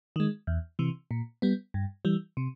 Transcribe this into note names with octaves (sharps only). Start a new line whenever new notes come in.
D#3 G#3
E2
C3 E3
A#2
G3 B3
G2
E3 G3
C3